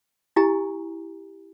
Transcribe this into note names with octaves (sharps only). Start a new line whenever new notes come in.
E4 G4 G#5 A#5